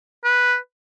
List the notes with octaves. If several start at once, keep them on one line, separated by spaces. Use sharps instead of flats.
B4